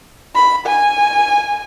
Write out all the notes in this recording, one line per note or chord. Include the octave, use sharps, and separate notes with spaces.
B5
G#5